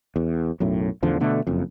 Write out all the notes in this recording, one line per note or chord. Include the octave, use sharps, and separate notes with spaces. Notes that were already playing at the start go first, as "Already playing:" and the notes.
E2
B1 F#2 A2
A1 E2 D3 F3
B2 D3 A3
F#1 F2